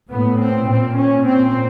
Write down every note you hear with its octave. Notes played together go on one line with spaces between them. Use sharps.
A2 B3
C4
A#2 C4
C#4
A#2 C4